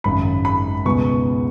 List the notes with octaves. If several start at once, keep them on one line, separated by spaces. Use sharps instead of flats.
G#1 F#2 C#3 B5
B5
C#2 B2 G#3 B3 C#6